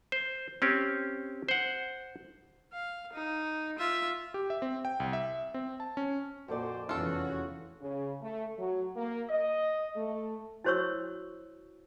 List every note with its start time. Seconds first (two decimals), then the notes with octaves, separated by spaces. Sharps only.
0.12 C5
0.62 C4 C#4 G4
1.49 C5 F#5
2.73 F5
3.13 D#4
3.78 F4 E5
4.34 G4
4.50 E5
4.62 C4
4.85 G5
5.00 C2
5.13 E5
5.54 C4
5.80 A5
5.97 C#4
6.48 F2 A#2 F#4 C5 D5
6.89 F1 E2 E3 C#4 F4 F#4 A4
7.81 C#3
8.21 A3
8.58 F#3
8.96 A#3
9.29 D#5
9.96 A3
10.64 E4 F#4 C5 C#5 C#6 E6